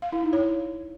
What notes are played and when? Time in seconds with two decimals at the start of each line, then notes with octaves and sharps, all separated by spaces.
0.02 F5
0.12 E4
0.23 D#4
0.33 C#5